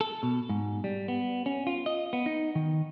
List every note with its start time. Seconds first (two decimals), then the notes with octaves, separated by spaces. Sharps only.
0.01 A4
0.23 B2
0.49 G#2
0.84 G3
1.08 B3
1.46 C#4
1.67 F4
1.86 D#5
2.13 B3
2.26 D#4
2.55 D#3